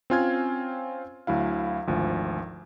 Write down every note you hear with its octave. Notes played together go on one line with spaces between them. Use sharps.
C4 C#4 F4 G#5 F6 G#6
D2 F#3 E4 F5
G#1 D2 F3